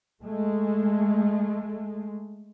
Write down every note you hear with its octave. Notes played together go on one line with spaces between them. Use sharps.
G#3 A3